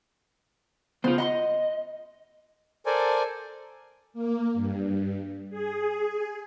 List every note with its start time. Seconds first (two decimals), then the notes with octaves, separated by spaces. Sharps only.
1.04 C#3 B3 F4 C5
1.18 D#5 F#5 B5 C6
2.86 A4 A#4 C5 D5 G#5
4.14 A#3
4.54 G2
5.50 G#4